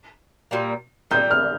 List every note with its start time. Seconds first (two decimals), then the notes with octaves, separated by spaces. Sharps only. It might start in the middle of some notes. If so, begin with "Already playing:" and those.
0.51 A#2 G3 A#3
1.11 A#2 G3 A#3 G6
1.31 F6